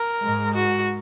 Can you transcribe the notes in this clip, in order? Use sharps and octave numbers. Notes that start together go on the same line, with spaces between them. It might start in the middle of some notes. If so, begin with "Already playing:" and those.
Already playing: A#4
G#2 G#3
F#4